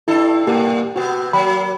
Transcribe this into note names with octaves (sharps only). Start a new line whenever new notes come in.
G2 D4 E4 A4
G2 A#2 A#3 G4 A#4
C3 B3 F#4
F#3 A#3 B5